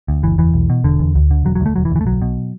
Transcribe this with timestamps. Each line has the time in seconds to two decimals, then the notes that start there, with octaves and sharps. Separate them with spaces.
0.08 D2
0.23 F#1 E3
0.38 E2 E3
0.54 B1
0.70 B2
0.84 E1 D3
0.99 E2
1.15 D2
1.31 D3
1.45 E1 F#3
1.55 F#3
1.61 D2 A3
1.75 E1 F#3
1.85 E3
1.91 D2
1.96 E3
2.01 A3
2.06 B1 F#3
2.22 B2